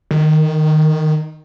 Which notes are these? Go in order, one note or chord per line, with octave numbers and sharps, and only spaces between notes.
D#3